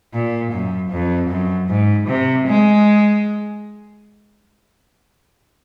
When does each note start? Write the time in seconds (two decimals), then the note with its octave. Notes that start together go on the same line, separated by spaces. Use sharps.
0.14 A#2
0.52 F#2
0.91 F2
1.30 F#2
1.69 G#2
2.08 C3
2.47 G#3